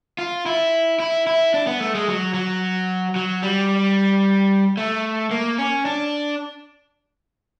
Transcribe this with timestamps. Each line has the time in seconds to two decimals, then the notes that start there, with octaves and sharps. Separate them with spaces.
0.19 F4
0.46 E4
1.00 E4
1.27 E4
1.54 D4
1.67 B3
1.80 A3
1.95 G#3
2.08 F#3
2.34 F#3
3.16 F#3
3.42 G3
4.77 A3
5.31 A#3
5.58 C#4
5.86 D4